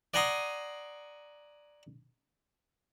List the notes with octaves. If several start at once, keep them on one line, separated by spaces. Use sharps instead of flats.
D5 F#5 G#5 A#5 C6 D#6